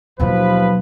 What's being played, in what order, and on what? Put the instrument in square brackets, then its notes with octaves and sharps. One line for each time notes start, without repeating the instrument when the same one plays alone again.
[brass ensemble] D#2 F3 B4 [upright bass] B2 F#3